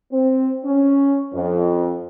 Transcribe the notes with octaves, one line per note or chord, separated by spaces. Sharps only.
C4
C#4
F2